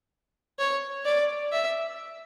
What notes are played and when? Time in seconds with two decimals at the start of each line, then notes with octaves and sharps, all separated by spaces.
0.59 C#5
1.05 D5
1.52 E5